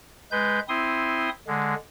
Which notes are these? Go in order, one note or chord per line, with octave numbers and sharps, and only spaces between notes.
G#3 B4 G6
C4 E4 C6 D#6
D3 G#3